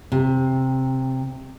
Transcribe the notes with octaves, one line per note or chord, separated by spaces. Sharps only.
C3